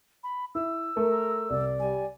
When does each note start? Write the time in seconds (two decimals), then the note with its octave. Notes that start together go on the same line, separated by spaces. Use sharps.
0.24 B5
0.55 E4 E6
0.97 A3 A#4
1.50 C2 D5
1.80 G3 G#5